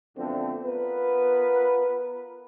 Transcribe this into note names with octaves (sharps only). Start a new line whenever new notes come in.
F#2 D3 F3 A3 B3 C4
B3 F4 A#4 B4